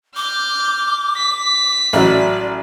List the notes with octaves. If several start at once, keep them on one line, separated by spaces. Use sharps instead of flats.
D6 F6 G6
B6
A1 F#3 D5